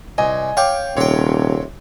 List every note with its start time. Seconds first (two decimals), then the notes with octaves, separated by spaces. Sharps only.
0.18 C2 D#5 G#5
0.57 C#5 F5 G5 D6
0.97 D#1 C3 C#5 G5